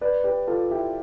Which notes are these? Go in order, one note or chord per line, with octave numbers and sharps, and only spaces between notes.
B4 D5
G4 B4
F4 A4
E4 G4